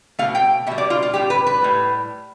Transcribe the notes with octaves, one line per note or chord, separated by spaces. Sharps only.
B2 A3 F5
G5
B2 G3 E5
D5
F4
F4
A2 G3 G4
B4
B4
A2 G3